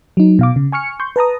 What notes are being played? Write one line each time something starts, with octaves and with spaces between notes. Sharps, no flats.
F#3 D#4
B2 F5 D6
C#3
G#5 C#6 F6 C#7
C6 C#6 G6
B4 A5 A#5 D#6